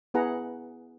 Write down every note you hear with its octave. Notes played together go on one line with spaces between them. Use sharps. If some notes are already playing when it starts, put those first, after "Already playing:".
B3 E4 G#4 B4 F#5 A#5